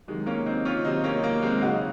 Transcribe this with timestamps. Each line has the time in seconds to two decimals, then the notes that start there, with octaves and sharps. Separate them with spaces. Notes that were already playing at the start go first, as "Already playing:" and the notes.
0.08 C3 D#3 F#3 G#3
0.26 A#3 C#4
0.45 C4 D#4
0.65 C#4 F4
0.84 C3 D#3 F#3 C4 D#4
1.04 A#3 C#4
1.23 A#3
1.42 G#3 C4
1.62 C#3 F#3 D#4 F#4